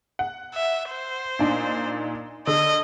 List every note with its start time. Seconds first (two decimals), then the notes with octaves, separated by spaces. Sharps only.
0.19 F#5
0.54 E5
0.89 C5
1.39 A#2 D4 D#4
2.47 D3 D#5